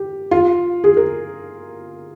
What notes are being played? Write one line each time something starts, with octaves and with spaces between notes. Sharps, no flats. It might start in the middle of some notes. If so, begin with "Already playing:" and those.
Already playing: G4
F4
G#4
A#4